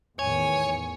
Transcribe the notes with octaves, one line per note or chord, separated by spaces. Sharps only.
E2 A2 D#3 C#5 G#5